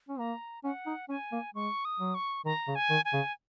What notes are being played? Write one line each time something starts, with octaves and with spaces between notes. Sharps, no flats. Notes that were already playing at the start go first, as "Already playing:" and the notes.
C#4
A#3 A#5
C#4 F#5
D#4
C#4 G#5
A#3
G#3 C#6
D#6
F#3
C#6
D#3 A#5
C#3
G#5
D#3
G#5
C#3